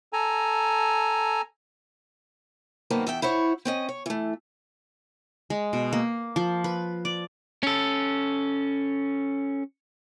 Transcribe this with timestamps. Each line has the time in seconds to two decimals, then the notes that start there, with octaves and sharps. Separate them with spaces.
0.13 A4 G#5 A#5
2.90 F#2 D#3 A#3 B3 C5 A5
3.07 E2 E5 G5
3.22 E4 C5 C#5 F#5
3.65 C4 C#4 D#5
3.89 C#5
4.06 E3 A3
5.50 G#3
5.73 B2
5.93 A#3
6.36 F3
6.64 B4
7.05 D5
7.63 C#4 A4